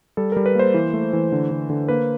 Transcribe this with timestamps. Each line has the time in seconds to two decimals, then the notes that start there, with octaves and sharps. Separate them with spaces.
0.17 G3 A4
0.32 G3 A#4
0.46 B4
0.55 A#3 C5
0.74 E3
0.93 A3
1.13 E3
1.32 D3
1.51 D3
1.70 D3
1.89 A#3 B4